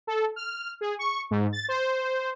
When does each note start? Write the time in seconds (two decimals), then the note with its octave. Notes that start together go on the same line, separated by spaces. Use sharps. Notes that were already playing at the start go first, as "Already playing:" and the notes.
0.07 A4
0.36 F6
0.81 G#4
0.99 C#6
1.31 G#2
1.53 A6
1.68 C5